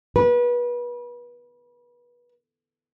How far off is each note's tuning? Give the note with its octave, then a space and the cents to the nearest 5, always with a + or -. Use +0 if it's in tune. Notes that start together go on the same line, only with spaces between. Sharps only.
B4 -30